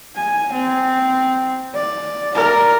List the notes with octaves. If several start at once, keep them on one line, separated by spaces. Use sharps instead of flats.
G#5
C4
D5
A#4 D5